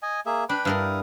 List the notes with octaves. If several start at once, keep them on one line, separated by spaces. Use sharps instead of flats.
D#5 G#5
A#3 G#4 E5
D4 B4 G5 B5
G2 G3 E4 A#4 F5 D#6